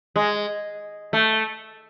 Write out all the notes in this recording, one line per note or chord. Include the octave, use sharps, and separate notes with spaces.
G#3
A3